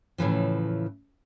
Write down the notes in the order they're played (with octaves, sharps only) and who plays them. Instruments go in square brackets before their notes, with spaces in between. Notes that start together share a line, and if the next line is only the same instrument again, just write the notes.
[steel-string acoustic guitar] A2 C#3 E3 F3